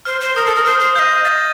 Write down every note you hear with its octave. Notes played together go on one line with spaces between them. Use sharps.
C5 F6
C5
A#4 D#6
A4 D#6
A#4
C5 F6
C5
D#5 F5 G6
D#5 F5 A6